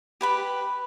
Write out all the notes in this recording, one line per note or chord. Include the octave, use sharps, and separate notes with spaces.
G4 B4 B5